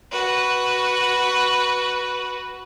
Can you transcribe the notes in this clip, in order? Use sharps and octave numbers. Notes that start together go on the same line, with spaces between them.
F#4 B4